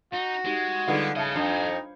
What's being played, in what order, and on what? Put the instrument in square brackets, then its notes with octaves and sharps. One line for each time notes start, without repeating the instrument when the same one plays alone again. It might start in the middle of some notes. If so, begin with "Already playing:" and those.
[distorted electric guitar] D#4 [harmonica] F#4
[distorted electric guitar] G#3 [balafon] D#4 G4
[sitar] D3 B3 F4 [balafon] G3 D#4 G#4
[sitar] C#3 [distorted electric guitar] A4 D#5 [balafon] E5 A5
[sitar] F2 [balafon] D4 [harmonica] D#4